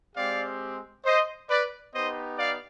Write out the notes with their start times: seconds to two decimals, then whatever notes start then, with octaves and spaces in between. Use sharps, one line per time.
0.16 G#3 C4 G4 D5 F5
1.05 C5 D#5
1.50 B4 D5
1.94 B3 D#4 G4 C5 D#5
2.38 D5 F5